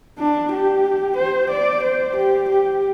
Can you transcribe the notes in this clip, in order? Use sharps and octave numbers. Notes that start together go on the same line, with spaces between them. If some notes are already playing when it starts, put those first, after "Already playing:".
D4
G4
C5
D5
C5
G4
G4